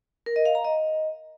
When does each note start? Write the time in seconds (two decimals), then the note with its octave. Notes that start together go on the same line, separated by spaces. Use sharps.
0.26 A#4
0.36 D#5
0.45 F5
0.55 A#5
0.65 D#5